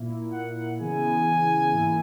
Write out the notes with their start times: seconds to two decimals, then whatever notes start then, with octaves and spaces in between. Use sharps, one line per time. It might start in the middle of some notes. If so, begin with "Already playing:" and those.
Already playing: A#2 A#3 E4
0.33 F#5
0.79 C#3 E3 B3 E4 G#4 G#5
1.72 G#2 E3 A#3 E4